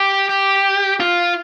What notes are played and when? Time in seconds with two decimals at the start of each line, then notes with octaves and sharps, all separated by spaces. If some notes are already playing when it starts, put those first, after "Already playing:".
Already playing: G4
0.29 G4
1.00 F4